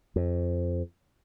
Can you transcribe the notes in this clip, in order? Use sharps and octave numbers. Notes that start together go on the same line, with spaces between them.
F2